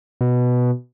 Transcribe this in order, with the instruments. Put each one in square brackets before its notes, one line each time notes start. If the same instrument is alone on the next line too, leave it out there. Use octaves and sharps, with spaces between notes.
[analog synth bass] B2